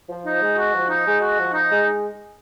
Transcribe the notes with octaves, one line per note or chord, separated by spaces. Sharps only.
F3
D#4
G#3
F#4
F3
D#4
G#3
F#4
F3
D#4
G#3